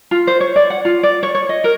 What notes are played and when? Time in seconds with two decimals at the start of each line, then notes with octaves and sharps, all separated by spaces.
0.11 F4
0.27 C5
0.40 C#5
0.56 D5
0.70 F#5
0.85 F4
1.03 D5
1.23 C#5
1.35 C#5
1.49 D#5
1.64 A#4